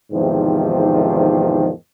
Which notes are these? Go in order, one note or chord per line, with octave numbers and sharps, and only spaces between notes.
E2 G#2 C3 D#3 F3